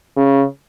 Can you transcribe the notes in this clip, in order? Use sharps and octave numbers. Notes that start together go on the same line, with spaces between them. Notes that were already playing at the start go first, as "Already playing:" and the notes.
C#3